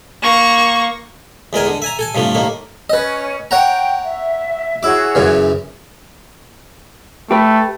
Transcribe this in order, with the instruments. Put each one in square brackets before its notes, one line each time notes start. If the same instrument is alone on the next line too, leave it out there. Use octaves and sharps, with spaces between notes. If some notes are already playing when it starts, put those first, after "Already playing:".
[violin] A#3 C#6
[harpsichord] E2 G#3 A#4 G#5
D3
E5 G#5 A#5
A4 G#5 A5
G2 C3 F3 A3
A2 D#3 A#3
[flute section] C#4 [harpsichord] B4 D#5
[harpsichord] C#5 F#5 A#5 [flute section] G5
[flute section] E5
[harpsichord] E4 D6 [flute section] F#4 G#4 C#5
[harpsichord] F#2 C#3 E3
[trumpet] A3 [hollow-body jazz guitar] G4 B4